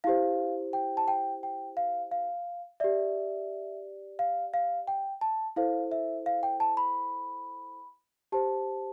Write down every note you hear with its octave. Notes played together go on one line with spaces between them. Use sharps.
E4 G4 C5 F5
G5
A5
G5
G5
F5
F5
G4 D5 E5
F5
F5
G5
A5
E4 A4 C5 F5
E5
F5
G5
A5
B5
G4 C5 A5